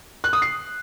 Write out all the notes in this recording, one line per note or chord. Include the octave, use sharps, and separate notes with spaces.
F#6
D#6
C7